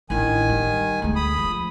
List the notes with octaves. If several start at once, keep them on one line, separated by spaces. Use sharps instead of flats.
A1 D#3 D4 G#5
G3
D2 G#3
B5 D#6
F3